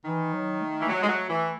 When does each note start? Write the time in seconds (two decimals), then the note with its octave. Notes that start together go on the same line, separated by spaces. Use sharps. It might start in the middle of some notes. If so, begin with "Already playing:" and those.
0.05 D#3 E3
0.33 F#3
0.61 A3
0.81 E3
0.88 F#3 A3
1.03 G#3
1.09 F#3
1.30 E3